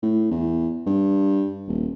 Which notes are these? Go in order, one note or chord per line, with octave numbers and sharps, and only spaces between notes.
A2
E2
G2
D#1